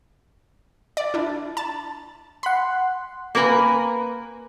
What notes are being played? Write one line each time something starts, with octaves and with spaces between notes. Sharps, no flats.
D5
D4 E4
A5
F#5 B5 C6
A#3 A#4 B4 G#5